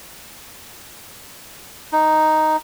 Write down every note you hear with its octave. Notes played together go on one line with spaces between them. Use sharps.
D#4